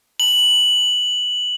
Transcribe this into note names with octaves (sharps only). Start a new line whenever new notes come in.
F#7